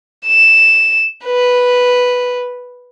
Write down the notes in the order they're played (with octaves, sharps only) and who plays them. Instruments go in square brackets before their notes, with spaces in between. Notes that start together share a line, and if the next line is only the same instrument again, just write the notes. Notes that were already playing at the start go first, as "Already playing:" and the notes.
[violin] E7
B4